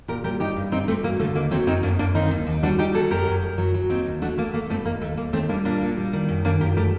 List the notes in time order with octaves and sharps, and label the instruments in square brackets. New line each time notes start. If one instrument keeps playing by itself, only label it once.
[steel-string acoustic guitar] A#2 G4 A#4
G3 G4 A#4
G2 D#4 G4
G2
G2 C4 D#4
G2 A3 C4
F#3 A#3
D3 A3
D#2 A#3
F#3 A3 C4
F#2 C4 D#4
F#2 A#3 D4
F#2 A#3 D4
D#3 C4 D#4
D#2
D#2
G3 D4 F#4
G3 D#4 G4
F#3 F#4 A4
F#2 G4 A#4
F#2
F#2
F#3
F#3
D#2 C4 D#4
D#2
A3 D4 F#4
A3 A#3
A3 A#3
G2 A3 C4
D#2 A#3
D#2 A3
D#2 A#3
D#3 A3 C4
G3 A#3 D4
A#2 A#3 D4
A#2
G3
D#3
F#2
D#3 A#3 D4
F#2 G4 A#4
A3 G4 A#4